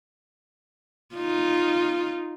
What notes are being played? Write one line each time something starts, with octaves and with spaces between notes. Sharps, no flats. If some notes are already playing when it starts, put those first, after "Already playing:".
D#4 F4